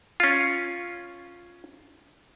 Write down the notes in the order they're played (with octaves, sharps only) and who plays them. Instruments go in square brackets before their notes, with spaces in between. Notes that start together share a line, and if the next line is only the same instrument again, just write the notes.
[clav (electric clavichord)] C#4 F4